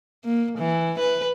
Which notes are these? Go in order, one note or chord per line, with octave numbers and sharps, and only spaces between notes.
A#3
E3
B4